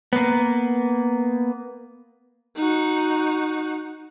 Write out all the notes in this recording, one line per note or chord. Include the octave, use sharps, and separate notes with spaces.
A#3 B3
D#4 F#4